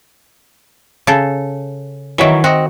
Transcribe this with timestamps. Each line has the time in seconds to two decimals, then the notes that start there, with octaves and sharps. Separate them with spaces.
1.07 C#3 A4
2.18 D#3 E3 F#3 C#5 E5
2.44 C4 F#4 D#5